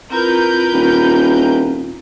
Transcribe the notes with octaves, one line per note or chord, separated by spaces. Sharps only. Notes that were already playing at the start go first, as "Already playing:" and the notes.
C4 E4 F4 A#4 B4 G6
D#1